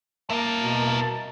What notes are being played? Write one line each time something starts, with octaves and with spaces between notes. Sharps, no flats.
A#3 E4 A#4 A5
B2